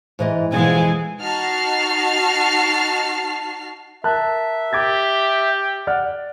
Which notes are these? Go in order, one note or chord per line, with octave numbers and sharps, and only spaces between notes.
G#2 E3 D#5
F2 B2 E3 G#3 G#4 G#5
D#4 F#4 A5 F6 C7
A#4 E5 A5 F#6
G4 D6 G#6 A6
D5 F#5 F6